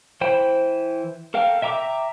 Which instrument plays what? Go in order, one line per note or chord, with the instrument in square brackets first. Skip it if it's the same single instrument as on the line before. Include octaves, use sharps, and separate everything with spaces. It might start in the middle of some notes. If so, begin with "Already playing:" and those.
[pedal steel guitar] E3 C5 G5 B5
A4 A#4 F5 G5
E5 G5 A#5 D6 E6